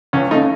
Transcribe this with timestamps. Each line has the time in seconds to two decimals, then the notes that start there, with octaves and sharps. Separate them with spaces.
0.13 C#2 C#4
0.31 C#3 A3 D#4